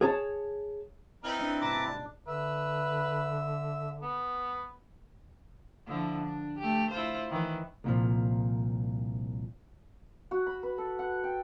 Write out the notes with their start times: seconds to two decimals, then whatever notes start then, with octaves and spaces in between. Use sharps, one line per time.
0.01 G#4 C#5 A5
1.24 B3 C4 D#4 E4 B4 F6
1.40 D4
1.61 B1 G2 B4 A5 A#5 D6
1.87 D4
2.27 D3 B4 E5
4.02 B3
5.86 D3 F3 E4
6.23 D4
6.58 A3 G4
6.91 E4 F4 C5
7.30 D#3 E3
7.84 C2 A#2 F3
10.31 F#4
10.46 B5
10.63 B4
10.78 A4
10.99 F#5
11.24 G5